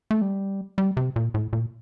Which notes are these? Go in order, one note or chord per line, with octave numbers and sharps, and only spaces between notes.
A3
G3
G3
C3
A#2
A2
A#2